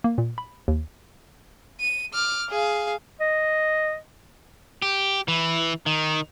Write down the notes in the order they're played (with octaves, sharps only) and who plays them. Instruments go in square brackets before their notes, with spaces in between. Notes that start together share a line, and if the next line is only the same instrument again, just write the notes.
[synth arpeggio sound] A#3
A#2
B5
D#2
[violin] D#7
D6 F6
G#4 F5
[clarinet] D#5
[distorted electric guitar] G4
E3
D#3